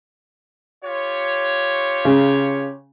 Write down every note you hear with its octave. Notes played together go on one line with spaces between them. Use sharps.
F4 G4 C#5
C#3